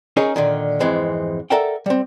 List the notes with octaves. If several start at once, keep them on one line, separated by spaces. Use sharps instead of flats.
C#4 D#4 G#4 A#4 C#5
A#2 D3 D#3
F2 G#2 E3 G#3 C4
A4 A#4 D5 E5 F#5 G5
G3 C4